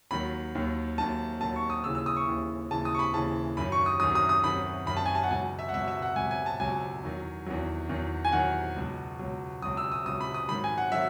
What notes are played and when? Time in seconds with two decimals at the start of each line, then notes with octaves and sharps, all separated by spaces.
0.11 D#2 D#3 F#3 B5
0.55 D#2 D#3 F#3
0.98 D#2 D#3 F#3 A5
1.41 D#2 D#3 F#3 A5
1.56 C#6
1.70 D#6
1.84 D#2 C#3 E3 E6
1.95 E6
2.06 D#6
2.17 C#6
2.27 D#2 C#3 E3
2.71 D#2 C#3 E3 A5
2.85 D#6
2.94 C#6
2.99 B5
3.14 D#2 C#3 E3 A5
3.57 F#2 D#3 F#3 B5
3.72 C#6
3.86 D#6
4.00 F#2 D#3 F#3 D#6
4.15 D#6
4.29 D#6
4.44 F#2 D#3 F#3 B5
4.86 F#2 D#3 F#3 B5
4.97 A5
5.06 G#5
5.15 A5
5.23 F#5
5.31 C#2 B2 F#3 G#5
5.59 E5
5.69 F#5
5.73 C#2 B2 F#3 E5
5.88 E5
6.02 F#5
6.16 C#2 B2 F#3 G#5
6.31 G#5
6.46 A5
6.60 C#2 B2 F#3 G#5
7.03 E2 D#3 F#3
7.46 E2 D#3 F#3
7.89 E2 D#3 F#3
8.25 G#5
8.32 E2 D#3 F#3 F#5
8.76 C#2 B2 F#3
9.19 C#2 B2 F#3
9.62 C#2 B2 F#3 D#6
9.77 E6
9.92 D#6
10.06 C#2 B2 F#3 D#6
10.21 B5
10.34 D#6
10.49 G#2 D#3 F#3 B5
10.64 G#5
10.78 F#5
10.92 D#3 F#3 E5